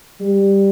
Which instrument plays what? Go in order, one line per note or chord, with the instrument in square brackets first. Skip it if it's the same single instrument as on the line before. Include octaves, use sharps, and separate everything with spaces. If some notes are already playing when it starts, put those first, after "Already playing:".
[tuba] G3